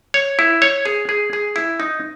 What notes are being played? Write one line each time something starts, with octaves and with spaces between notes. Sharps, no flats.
C#5
E4
C#5
G#4
G#4
G#4
E4
D#4